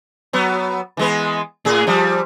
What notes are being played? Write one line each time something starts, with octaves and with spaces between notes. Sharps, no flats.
F#3 B3
E3 G#3 B3
A2 G#4
F3 G3